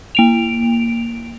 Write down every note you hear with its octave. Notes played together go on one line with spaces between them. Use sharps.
A#3 D7 F7